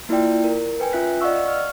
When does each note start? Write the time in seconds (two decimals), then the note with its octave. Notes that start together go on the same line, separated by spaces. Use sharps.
0.09 A#3 E4 F4 D5 G5
0.44 A#4
0.80 B4 G5 G#5
0.93 C#4 F4 E5 F#6 B6
1.21 D5 D#5 F5 F#5 C#6 E6
1.46 C#6 F6